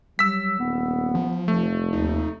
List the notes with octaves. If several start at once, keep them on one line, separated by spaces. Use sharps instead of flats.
F#3 G3 E6 B6
D#1 B3
F3
F1 A3
D#2 D#4